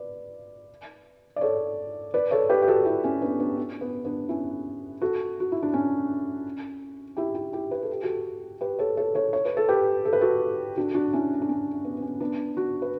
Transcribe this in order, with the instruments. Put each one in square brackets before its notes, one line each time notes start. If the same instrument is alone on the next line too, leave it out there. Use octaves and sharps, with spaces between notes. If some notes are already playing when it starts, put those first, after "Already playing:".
Already playing: [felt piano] B4 D5
D5
A4 C#5
B4 D5
A4 C#5
G4 B4
G4
F#4 A4
E4 G4
C#4 E4
B3 D4
B3 D4
C#4
B3
B3 D4
C#4 E4
F#4 A4
F#4
E4
D4
C#4
E4 G4
E4 G4
E4 G4
B4
A4
G4
F#4 A4
G4 B4
A4 C#5
A4 C#5
A4 C#5
C#5
B4
A4
G4 B4
A4
B4
F#4 A4
D4 F#4
D4 F#4
C#4 E4
D4
C#4
B3
B3
C#4
B3 D4
D4 F#4
B4